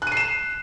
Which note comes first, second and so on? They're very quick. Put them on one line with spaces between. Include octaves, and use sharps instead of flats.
F#6 D#7 C7 E7